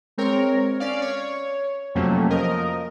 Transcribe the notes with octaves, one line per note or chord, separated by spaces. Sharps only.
G#3 C4 A#4 C#5
C#4 D5 F5
C#5
F2 C3 F#3 A3 A#3 C#4
F3 A#4 D#5